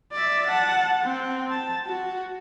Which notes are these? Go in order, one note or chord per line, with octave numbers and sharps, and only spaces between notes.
D5 E5
F#5 A5
C4
A5
F#4